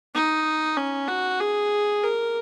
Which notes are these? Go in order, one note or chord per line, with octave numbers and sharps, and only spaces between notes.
D#4
C#4
F#4
G#4
A#4